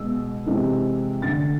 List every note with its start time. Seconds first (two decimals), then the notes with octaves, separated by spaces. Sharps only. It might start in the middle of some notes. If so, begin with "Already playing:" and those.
Already playing: B2 G#3 E6
0.46 C3 E3 G#3
1.22 D3 A3 A6